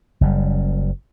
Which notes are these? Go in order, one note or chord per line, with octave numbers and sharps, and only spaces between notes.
F#1 F#2 G3